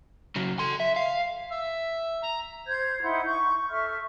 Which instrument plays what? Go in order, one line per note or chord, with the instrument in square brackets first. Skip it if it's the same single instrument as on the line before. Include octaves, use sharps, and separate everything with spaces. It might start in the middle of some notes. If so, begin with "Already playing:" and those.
[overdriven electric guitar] C#3 F#3
A4 C6
E5
F5
[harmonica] E5
A#5
[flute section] C5 G6 G#6
D#4 E4 F#5 C6
C#6 G6
A4 E5 C#6 F6